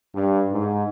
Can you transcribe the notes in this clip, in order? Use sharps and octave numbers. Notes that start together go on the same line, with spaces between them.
G2
G#2